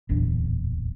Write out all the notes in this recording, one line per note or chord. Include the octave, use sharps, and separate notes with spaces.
D1 A#1 E2 D4